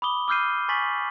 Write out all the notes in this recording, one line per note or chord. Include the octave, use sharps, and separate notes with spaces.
B5 D6 D#6 G7
D6 E6 F6 G6 C7 D#7
G#5 C#6 A6 B6 F#7